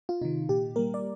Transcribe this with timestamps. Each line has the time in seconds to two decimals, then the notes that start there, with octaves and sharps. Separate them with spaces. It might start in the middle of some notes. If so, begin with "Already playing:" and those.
0.09 F4
0.21 C3 D#3 D#4
0.49 A#2 G4
0.76 G3 A#3 A#4
0.94 D5